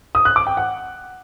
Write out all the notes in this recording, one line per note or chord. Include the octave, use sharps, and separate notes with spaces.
D#6
F#6
D6
G5
F#5